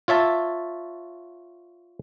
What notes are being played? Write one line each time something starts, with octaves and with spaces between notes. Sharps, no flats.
F4 C#5 E5 A5